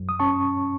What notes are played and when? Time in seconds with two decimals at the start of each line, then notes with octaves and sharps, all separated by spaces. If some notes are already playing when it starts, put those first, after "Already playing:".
Already playing: F#2
0.09 D#6
0.20 C#4 A5 C#6